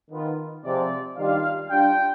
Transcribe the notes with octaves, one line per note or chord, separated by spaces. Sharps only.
D#3 B3 F4
C3 F3 G#3 C4 D5
D#3 G3 D4 F4 F5
G3 D4 F4 G5